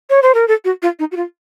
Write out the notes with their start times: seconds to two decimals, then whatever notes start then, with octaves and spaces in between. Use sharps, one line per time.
0.10 C#5
0.22 C5
0.34 A#4
0.48 A4
0.65 F#4
0.82 F4
0.99 D#4
1.12 F#4
1.16 F4